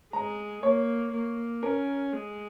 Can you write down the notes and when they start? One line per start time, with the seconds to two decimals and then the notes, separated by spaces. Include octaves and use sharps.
0.13 G#3 A#5
0.63 A#3 C#5
1.13 A#3
1.62 C#4 A#4
2.13 G#3